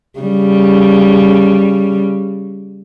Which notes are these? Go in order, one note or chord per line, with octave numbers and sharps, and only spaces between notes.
C#3 G3